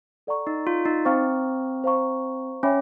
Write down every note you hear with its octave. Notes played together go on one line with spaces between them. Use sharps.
A4 D5 F#5 A#5 C#6
D#4
F4
D#4
C4 C5 F5 A#5 C#6
C5 F5 A#5 C#6
C#4 C#5 E5 G5 B5 D6